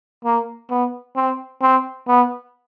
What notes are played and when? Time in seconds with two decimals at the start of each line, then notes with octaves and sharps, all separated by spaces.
0.25 A#3
0.70 B3
1.16 C4
1.62 C4
2.08 B3